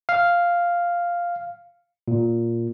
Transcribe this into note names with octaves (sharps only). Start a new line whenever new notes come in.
F5
A#2